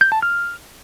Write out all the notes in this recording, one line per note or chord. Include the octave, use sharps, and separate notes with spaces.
G6
A5
F6